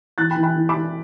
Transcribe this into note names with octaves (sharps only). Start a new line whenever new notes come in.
E3 F#6 A6
G5 B5
E3
G5 B5
E3
B5 D6
E3